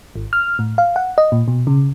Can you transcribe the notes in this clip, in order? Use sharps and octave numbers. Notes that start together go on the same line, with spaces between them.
G#1
F6
A2
F5
F#5
D#5
A#2
B2
C#3